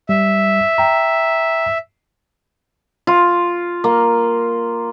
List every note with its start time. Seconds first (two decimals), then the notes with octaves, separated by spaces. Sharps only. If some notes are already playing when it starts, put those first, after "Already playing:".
0.09 G3 E5
0.78 G5 A#5
3.07 F4
3.84 A#3